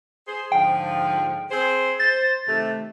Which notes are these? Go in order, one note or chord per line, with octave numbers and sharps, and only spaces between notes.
G#4 C5
G#2 D3 F3 G5
C4 G#4 C5
C5 A6
C3 D#3 A3